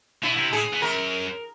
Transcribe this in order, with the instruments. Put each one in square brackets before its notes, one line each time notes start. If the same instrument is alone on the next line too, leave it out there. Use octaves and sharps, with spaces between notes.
[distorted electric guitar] B2 [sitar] E4
[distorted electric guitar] C3
[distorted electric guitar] A2 [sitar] G#4
[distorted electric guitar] B2
[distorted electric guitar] F#2 [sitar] A#4